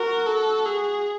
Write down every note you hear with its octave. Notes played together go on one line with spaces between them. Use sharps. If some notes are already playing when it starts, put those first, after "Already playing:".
Already playing: F#4 A#4
A4
G#4